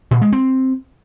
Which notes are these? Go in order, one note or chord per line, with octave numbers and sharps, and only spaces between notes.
A#2
G#3
C4